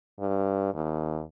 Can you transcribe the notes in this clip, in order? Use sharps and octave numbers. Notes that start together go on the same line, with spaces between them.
G2
D#2